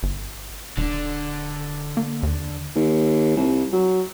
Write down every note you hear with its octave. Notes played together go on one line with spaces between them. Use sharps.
G1
D#1 D3 D4
A#3
D#2
D#2
C2
F#3